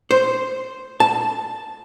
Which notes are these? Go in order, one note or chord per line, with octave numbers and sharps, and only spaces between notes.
C5
A5